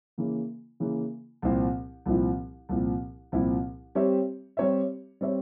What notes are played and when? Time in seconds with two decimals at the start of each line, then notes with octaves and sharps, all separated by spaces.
0.18 C#3 E3 A#3
0.80 C#3 E3 A#3
1.42 C2 A#2 F3 C4 E4
2.06 C2 A#2 F3 C4 E4
2.69 C2 A#2 F3 C4 E4
3.32 C2 A#2 F3 C4 E4
3.95 G3 C4 G4 C#5 E5
4.57 G3 C4 G4 C#5 E5
5.21 G3 C4 G4 C#5 E5